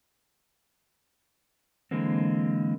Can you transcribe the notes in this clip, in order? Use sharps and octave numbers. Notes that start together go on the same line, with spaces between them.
D3 E3 G#3 A#3 C4